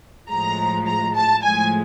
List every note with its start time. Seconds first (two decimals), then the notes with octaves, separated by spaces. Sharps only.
0.28 A2 F3 G#3 A#5
0.86 A#5
1.15 A5
1.43 A2 F3 G#3 G#5